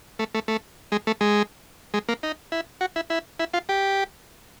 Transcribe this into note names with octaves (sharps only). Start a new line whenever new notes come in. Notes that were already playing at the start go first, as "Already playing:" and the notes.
A3
A3
A3
G#3
A3
G#3
G#3
A#3
D#4
E4
F#4
E4
E4
E4
F4
G4